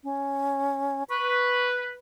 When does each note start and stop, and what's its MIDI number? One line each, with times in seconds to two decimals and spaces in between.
0.04 1.03 61
1.09 1.97 71
1.09 1.67 85